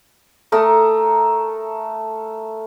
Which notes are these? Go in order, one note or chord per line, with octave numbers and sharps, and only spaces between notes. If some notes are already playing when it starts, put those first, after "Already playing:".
A3 A4 A#4 D#6